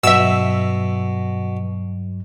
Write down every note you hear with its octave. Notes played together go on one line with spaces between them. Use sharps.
G2 B2 F#3 E5 E6